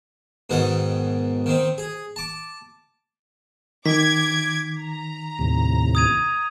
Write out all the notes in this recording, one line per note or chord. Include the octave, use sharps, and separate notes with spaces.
G#2 B2 D#3 D#5 F#5
D#3 C4
G#4
A5 D6
D#3 D6 G#6 B6
A#5
D#2 A2 C3
D#6 G#6 D#7